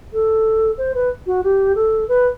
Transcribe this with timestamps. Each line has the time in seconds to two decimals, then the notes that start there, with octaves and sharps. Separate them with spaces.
0.13 A4
0.78 C5
0.95 B4
1.27 F#4
1.44 G4
1.75 A4
2.08 B4